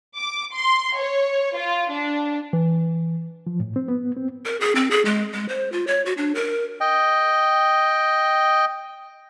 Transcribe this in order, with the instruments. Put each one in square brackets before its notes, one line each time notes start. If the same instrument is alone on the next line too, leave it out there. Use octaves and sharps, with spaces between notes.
[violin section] D6
C6
C#5
F4
D4
[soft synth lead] E3
[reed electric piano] F3
A2
C4
B3
C4
[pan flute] A#4
G#4
C4
G#4
G#3
G#3
C5
F4
C#5
F#4
D4
A#4
[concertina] D#5 G5